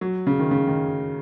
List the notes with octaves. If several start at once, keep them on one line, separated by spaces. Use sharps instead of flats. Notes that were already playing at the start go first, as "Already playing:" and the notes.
F#3
C#3
D#3
C#3
D#3